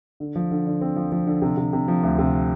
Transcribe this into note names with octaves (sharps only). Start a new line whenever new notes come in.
D3
F3
D3
D3
C4
F3
F3
D3
C3
C3
C3
F3
D2
C3